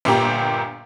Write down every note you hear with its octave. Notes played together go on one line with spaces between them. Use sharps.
G1 A#2 G4 A#5